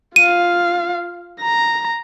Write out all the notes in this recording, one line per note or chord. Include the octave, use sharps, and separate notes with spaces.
F4 F5 D#7
A#5